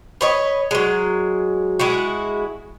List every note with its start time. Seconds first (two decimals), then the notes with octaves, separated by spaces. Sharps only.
0.21 B4 C#5 D#5
0.71 F#3 G#3
1.79 G#3 E4 F#4